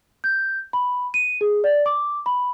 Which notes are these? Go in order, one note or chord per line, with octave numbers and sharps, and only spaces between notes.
G6
B5
D#7
G#4
D5
D6
B5